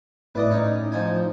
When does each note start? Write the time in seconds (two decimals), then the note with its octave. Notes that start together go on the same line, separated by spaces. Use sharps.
0.35 A2 B4 D5 D#5
0.50 C#4 D#4
0.92 F3 D#4 G#5